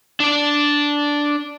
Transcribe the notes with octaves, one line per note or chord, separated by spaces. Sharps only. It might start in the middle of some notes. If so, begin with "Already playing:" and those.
D4 D5